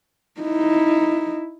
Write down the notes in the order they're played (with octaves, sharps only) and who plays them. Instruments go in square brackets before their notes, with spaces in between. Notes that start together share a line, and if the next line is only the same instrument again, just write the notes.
[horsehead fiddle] D#4 E4